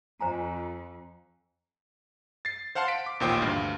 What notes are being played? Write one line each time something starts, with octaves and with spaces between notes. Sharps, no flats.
F2 C5 G#5 A#5
A6 C7
C5 F5 F#5 A5 C6
B6 D7
D6
A1 D#2 A#2 C5 G5 D#6
D2 G2 F5